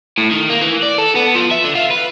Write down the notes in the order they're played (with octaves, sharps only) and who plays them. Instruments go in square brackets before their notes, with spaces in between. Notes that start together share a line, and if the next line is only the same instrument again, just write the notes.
[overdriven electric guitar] A2
D#3
A#3
E3
D5
A4
B3
F3
E5
D3
F4
B4